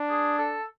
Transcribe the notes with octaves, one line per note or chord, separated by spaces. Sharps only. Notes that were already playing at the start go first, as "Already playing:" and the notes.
Already playing: D4
G#4
A4